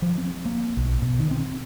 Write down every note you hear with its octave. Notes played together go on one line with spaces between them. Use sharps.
F3
C4
A#3
B1
B2
D#3
C4